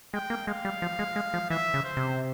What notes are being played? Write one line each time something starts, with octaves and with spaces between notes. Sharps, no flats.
G#3 G5
A#3
G#3 F5
G3
F3
G#3
G#3
F3
E3 E5
C#3
C5
C3